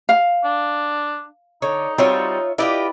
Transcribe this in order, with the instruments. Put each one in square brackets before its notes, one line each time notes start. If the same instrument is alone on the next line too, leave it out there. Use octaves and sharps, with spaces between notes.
[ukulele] F5
[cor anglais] D4
[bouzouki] D3 [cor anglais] D#4 [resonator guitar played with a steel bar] C#5
[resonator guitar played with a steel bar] G3 C4 F#4 [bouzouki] F4 C#5 E5
[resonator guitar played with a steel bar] E4 B4 D5 [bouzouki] F4 G4 D#5